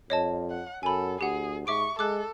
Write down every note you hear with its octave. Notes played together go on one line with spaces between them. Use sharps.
F2 C#5 D#5 A5
F#5
F#2 A4 G#5 B5
D2 G4 G#4 F#5
G#2 E5 C#6 D6 D7
G#3 A4 D6 F#6